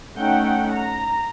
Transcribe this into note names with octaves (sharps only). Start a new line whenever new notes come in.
A3 C#4 D#4 F#5 G5
A#5